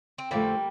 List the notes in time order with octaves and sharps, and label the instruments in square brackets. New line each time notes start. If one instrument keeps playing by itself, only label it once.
[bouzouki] C4
[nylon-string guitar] F2 D3 F3 A3 [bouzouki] G3 A#3